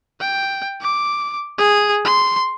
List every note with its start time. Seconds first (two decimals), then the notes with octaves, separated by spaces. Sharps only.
0.20 G5
0.81 D6
1.58 G#4
2.05 C6